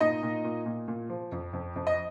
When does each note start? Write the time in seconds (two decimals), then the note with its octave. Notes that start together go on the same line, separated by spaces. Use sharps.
0.01 A#2 D#4 D#5
0.23 A#2
0.44 A#2
0.66 A#2
0.88 A#2
1.09 F3
1.32 F2
1.53 F2
1.76 F2
1.87 D#5